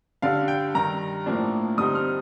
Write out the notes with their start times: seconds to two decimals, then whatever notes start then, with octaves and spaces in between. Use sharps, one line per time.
0.22 G2 D3 G3 D4 F5
0.48 G5
0.75 G2 D#3 G3 A#5
1.26 A2 F3 A#3 D4
1.78 G2 D3 G3 C4 D#4 D#6
1.95 F6